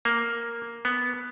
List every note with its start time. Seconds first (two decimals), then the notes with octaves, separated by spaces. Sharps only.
0.05 A#3
0.85 B3